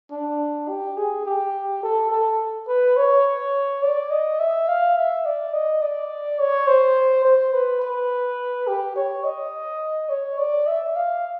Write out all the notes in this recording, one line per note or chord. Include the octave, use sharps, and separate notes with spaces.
D4
G4
G#4
G4
A4
A4
B4
C#5
D5
D#5
E5
F5
E5
D5
D#5
D5
C#5
C5
C5
B4
B4
G4
C#5
D#5
C#5
D5
E5
F5